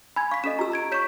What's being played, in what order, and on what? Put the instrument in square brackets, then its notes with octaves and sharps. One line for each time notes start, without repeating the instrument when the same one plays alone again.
[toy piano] G#5 [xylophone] B5 G#6
[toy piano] F5 [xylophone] C#6 B6
[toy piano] C#4 A4 D#5 [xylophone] E7
[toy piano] F4 G4 E6 [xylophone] A#5
[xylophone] A#5 G#6 D7
[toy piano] C#5 C#6 [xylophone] G6 B6 E7